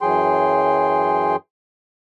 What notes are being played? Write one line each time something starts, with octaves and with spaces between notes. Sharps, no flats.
F#2 E3 F#3 G#4 G5 C6